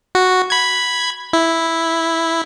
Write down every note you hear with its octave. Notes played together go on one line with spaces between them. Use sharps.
F#4
B5 G#6
E4